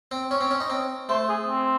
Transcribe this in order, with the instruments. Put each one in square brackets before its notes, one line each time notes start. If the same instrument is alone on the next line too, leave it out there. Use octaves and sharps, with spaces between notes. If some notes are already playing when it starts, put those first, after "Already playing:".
[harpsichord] C4
[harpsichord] C#4 [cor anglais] C#5
[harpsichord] C4
C#4
D#4
C4
[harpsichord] A3 [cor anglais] C5
[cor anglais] G#4
C4